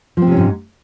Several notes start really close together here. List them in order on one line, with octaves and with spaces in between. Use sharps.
F3 C4 C3 C#4 G#2